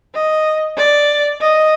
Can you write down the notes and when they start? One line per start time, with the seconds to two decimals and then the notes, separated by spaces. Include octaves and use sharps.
0.14 D#5
0.78 D5
1.40 D#5